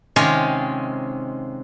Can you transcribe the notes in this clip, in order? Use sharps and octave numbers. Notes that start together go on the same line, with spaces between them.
C3 D#3 G#3 C#4 F4